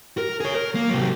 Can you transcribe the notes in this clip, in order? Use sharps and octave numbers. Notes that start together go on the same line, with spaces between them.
A#4
G#4 C#5
A#4
A#3
C3 F#3